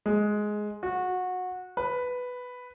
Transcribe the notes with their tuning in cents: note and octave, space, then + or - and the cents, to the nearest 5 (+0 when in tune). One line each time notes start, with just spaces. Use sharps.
G#3 +10
F#4 -20
B4 +5